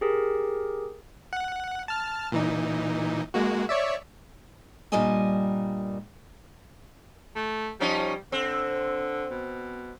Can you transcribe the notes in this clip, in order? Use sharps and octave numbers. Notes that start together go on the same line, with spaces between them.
G4 G#4 A#4
F#5
A5 F6
A#2 E3 D#4
G#3 A#3 F#4
C#5 D5 E5
G2 A#2 G3 A#4 D#5 G#5
A3
F3 G3 C#4 D#4
D3 C4
B2